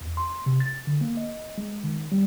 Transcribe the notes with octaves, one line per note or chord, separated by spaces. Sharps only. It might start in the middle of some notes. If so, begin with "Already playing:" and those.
E2
C6
C3
A6
D3
A#3
D#5
G#3
D#3
G3